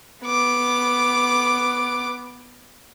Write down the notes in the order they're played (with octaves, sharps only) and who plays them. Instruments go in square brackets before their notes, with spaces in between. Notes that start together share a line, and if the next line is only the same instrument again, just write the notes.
[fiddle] B3 D6